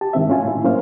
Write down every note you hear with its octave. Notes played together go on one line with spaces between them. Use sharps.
G4 A5
G#2 D#3 C4 E5
A3 C#4 F4 G#5
A2 E4
F#3 A#3 C#4 C5 F5